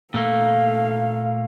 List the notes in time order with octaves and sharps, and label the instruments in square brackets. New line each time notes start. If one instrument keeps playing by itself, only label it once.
[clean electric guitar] A#2 A3 A#3 [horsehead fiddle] A4 F5